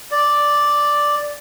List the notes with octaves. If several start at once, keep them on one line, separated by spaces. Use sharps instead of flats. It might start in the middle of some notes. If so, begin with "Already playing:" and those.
D5